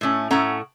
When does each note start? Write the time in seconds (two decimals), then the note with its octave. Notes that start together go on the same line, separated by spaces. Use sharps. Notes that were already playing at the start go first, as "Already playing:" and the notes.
0.01 A2 A3 C#4
0.31 A2 A3 C#4 F#5 A#5